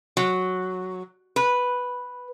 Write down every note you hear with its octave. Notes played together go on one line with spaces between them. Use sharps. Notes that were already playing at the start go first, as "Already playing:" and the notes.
F#3
B4